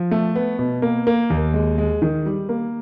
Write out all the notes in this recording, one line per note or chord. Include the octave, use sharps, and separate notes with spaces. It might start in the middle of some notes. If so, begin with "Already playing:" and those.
Already playing: F3
A3
B3
B2
A#3
A#3
D#2
G#3
G#3
D#3
G3
A#3